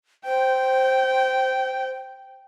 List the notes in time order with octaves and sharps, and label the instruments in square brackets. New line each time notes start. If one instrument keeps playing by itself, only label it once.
[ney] C5 [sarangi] G5